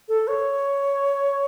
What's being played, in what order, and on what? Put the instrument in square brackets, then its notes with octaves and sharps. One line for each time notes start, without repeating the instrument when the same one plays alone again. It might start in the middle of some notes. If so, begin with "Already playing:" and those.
[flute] A4
C#5